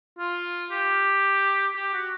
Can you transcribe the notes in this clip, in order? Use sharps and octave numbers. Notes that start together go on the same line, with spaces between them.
F4
G4
G4
F#4